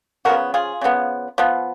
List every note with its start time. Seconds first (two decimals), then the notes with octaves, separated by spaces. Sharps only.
0.25 C#3 F3 B3 F#4 A#4
0.54 F4 G#4
0.81 C#3 F3 B3
1.38 F3 B3